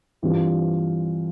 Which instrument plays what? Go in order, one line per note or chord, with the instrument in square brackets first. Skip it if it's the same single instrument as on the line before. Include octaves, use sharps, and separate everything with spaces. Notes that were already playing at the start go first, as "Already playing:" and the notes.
[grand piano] G2 E3 G3 C4 F4